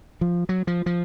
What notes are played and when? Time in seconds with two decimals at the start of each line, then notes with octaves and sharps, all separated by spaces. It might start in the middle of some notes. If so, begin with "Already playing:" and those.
0.21 F3
0.49 F#3
0.67 F3
0.86 F3